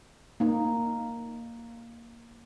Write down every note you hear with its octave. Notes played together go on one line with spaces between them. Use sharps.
A#3 D#4